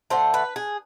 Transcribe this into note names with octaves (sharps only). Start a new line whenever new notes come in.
D3 A3 C5
B4
G#4